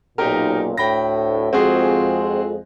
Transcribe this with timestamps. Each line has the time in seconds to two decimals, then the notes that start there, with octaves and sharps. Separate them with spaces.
0.18 B1 F#2 A#2 D#4 G4 A#4
0.77 D2 A2 G5 B5 A#6
1.53 F2 G#3 C4 F#4 G#4